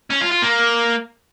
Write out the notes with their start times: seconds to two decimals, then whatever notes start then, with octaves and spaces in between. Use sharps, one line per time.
0.10 C#4
0.21 F4
0.32 F4
0.42 A#3